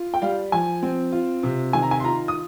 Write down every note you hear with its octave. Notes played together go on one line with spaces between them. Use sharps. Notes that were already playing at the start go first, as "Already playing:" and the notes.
Already playing: F4
G5
G3 F5
F3 G#5
C4
F4
C3
D#3 G#5
A#5
G#5
C6
F4 A#5
D#6